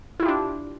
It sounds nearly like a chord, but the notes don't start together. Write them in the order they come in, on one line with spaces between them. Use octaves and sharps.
E4 F4 G4 D4